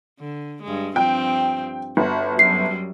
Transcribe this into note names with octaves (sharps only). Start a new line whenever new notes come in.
D3
G2 G#3
G2 F3 C4 G5
G1 F#4
F#2 F#3 G3 C7